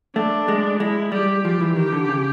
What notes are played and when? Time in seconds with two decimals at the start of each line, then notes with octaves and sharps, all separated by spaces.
0.16 A3 D4
0.48 G#3
0.80 G#3 E4
1.12 G3 G4
1.45 F3 G4
1.61 E3
1.76 D#3 G4
1.93 D3
2.09 C#3